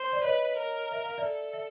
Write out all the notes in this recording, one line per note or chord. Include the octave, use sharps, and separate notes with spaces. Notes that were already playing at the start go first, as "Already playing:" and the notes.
Already playing: C5
D5
B4 C#5 D#5
A#4
E5
F5
D5 E5
A4
E5